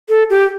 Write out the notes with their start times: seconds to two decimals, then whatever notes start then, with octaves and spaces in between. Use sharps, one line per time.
0.09 A4
0.30 G4